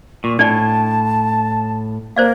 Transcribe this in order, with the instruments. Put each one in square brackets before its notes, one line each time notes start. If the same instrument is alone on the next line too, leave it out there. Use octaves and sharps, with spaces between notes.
[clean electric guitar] A#2 [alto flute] C#6
[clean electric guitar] A2 [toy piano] D4 D5 [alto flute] A5
[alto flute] A#3 [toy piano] C5 D5 F5